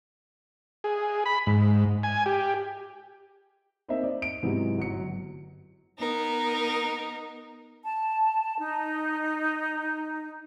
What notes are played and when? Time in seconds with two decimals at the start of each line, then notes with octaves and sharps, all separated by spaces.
0.84 G#4
1.26 B5
1.47 G#2
2.03 G#5
2.26 G4
3.88 A#3 C4 D#4 C5 D#5 E5
4.04 D5
4.22 D7
4.43 G#2 C3 E3 F#3 B3 D#4
4.78 G1 F#3 C#7
5.99 B3 D#4 A#4
7.83 A5
8.59 D#4